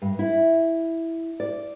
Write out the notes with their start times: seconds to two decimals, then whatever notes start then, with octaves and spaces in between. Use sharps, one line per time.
0.02 G2
0.19 E4
1.40 D5